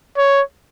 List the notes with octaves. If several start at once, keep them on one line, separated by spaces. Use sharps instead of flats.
C#5